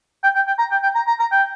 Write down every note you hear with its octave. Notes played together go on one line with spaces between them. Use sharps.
G5
G5
G5
A#5
G5
G5
A#5
A#5
A#5
G5